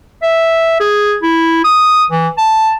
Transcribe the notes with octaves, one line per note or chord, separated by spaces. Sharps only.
E5
G#4
E4
D#6
E3
A5